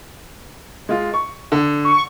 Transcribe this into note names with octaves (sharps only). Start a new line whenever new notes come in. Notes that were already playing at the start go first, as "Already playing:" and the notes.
G#3 F4
C#6
D3
C#6